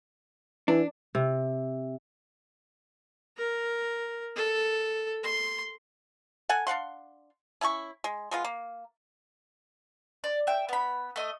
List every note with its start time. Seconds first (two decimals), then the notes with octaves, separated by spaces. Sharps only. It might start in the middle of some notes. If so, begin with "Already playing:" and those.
0.68 E3 D4
1.15 C3
3.38 A#4
4.36 A4
5.23 C6
6.49 A4 F#5 G#5
6.67 D4 F5 F#5 C6
7.61 C#4 E4 G#5 C#6
8.04 G#3
8.31 G#3 B3 F4
8.44 A#3
10.24 D5
10.47 E5 G5
10.69 B3 B5
11.16 A3 D#5